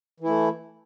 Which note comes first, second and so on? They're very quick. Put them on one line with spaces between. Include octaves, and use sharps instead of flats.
E3 E4 A3